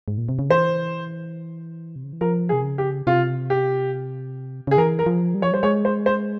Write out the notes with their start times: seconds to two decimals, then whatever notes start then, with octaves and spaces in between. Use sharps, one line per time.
0.08 G#2
0.18 A#2
0.29 C3
0.39 C#3
0.50 E3 C5
1.96 C3
2.04 C#3
2.13 E3
2.21 F3 A#4
2.49 G#4
2.53 C3
2.64 C#3
2.78 G4
3.07 C3 F4
3.50 G4
4.67 C#3 G#4
4.78 E3 A#4
4.99 A#4
5.06 F3
5.35 G3
5.42 F3 C#5
5.52 G3 C5
5.63 G#3 C#5
5.85 C5
6.06 C5